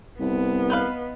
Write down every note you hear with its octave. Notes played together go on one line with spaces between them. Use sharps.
C2 B3
D#4 B4 F5